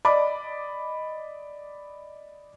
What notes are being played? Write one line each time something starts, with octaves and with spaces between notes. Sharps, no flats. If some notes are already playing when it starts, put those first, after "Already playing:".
D5 D#5 B5 D6